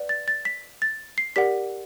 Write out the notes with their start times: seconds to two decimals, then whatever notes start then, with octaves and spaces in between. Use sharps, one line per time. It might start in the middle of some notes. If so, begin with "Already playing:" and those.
Already playing: B4 D5 F#5
0.09 A6
0.28 A6
0.45 B6
0.82 A6
1.18 C7
1.36 G4 A#4 D5 F#5 B6